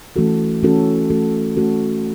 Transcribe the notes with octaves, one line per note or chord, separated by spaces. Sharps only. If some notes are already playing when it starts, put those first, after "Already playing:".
E3 A3 C#4 F#4 A4
E3 A3 C#4 F#4 A4
E3 A3 C#4 F#4 A4
E3 A3 C#4 F#4 A4